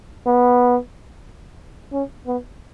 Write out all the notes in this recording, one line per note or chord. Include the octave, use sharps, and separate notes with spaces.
B3
C#4
B3